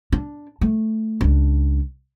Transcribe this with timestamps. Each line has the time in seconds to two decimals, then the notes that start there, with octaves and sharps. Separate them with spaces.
0.12 D4
0.61 A3
1.21 C#2 D4